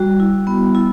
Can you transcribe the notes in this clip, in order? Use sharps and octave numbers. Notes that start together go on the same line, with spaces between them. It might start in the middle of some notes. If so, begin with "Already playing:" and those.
Already playing: G3 F#4
E4
B3
E4